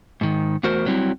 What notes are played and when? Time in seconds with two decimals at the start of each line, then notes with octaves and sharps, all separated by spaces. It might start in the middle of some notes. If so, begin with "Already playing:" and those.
0.21 G#2 D#3
0.63 E2 A3 F#4 A#4 C5
0.86 F#3 G3 C4 E4